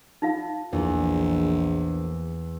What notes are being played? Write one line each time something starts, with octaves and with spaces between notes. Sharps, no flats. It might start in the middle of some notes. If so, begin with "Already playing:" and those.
D#4 F4 F5
A#1 E2